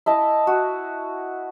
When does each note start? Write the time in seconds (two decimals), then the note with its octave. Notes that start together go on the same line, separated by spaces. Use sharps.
0.06 E4 D#5 A5
0.47 F#4